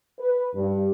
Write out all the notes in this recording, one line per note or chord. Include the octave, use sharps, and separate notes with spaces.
B4
G2